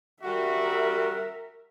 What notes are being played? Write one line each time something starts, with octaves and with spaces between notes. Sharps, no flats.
G3 F#4 A#4 E5